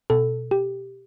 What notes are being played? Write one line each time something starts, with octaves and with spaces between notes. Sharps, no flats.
B2 A4
G4